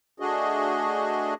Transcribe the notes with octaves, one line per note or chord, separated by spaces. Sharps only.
A3 D4 F#4 G#4 D#5